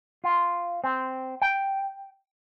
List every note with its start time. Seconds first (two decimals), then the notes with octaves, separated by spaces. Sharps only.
0.24 F4
0.84 C4
1.42 G5